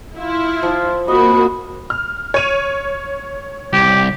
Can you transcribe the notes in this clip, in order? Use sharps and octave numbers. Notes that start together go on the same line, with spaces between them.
E4 F4
F3
A#3 C4 F#4 D#5 B5
F6
C#5 D#7 F7
C2 G4